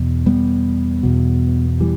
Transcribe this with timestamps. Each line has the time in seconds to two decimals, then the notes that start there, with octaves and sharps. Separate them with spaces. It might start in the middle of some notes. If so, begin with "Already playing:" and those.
Already playing: E2 B2
0.26 G3 B3
1.03 E2 B2
1.80 E3 G3